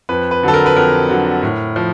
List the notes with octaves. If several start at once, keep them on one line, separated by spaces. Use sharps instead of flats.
F2 B4
B4
D3 F#3 A4
A#4
B4
F2 A#4
D3 F#3
A2
F3